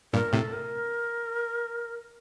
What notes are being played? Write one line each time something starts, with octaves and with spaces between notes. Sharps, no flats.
G2 A#2 A#4
A2 C3 A4
A#4